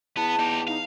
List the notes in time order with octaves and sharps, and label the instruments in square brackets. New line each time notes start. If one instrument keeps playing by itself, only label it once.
[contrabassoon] E2 [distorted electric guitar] B3 [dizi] A5
[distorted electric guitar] D#4 G4
[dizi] D#4 [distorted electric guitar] F5